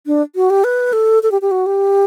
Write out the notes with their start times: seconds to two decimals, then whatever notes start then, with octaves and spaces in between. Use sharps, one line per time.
0.06 D4
0.36 F#4
0.50 G4
0.64 B4
0.93 A4
1.23 A4
1.32 G4
1.42 G4
1.51 F#4
1.66 G4